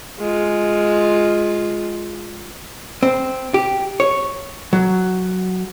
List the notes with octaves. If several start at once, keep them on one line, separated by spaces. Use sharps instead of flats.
G#3 F4
C4
G4
C#5
F#3